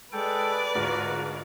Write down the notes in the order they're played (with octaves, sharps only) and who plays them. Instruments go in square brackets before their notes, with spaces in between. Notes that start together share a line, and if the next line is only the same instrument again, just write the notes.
[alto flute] G#3 [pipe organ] A4 G5 [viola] B4 D5
[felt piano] D2 G#2 [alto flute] F4 [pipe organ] F#4 A#4